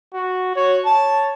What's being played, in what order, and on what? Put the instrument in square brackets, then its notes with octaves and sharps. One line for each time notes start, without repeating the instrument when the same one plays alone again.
[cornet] F#4
[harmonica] F#4 [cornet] C#5
[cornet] C#5 [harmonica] A5